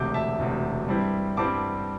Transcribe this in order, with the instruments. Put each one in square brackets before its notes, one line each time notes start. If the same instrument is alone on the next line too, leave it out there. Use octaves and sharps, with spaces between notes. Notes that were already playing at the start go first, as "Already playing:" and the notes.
Already playing: [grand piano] E1 D2 C3 D6 G6
E5 A5
E1 D2 C3
G2 G3 C4 E4
G2 G3 C4 E4 A5 D6